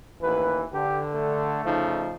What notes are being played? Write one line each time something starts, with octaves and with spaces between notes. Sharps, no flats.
A1 D#2 E3 B4
D3 G4
A3
C#3 F3 D#4